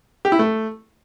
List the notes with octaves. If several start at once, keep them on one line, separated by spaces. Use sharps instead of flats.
G4
E4
A3